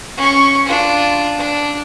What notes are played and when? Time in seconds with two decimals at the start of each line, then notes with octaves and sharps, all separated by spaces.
0.17 C#4 C#6
0.66 D4 F4
1.38 D4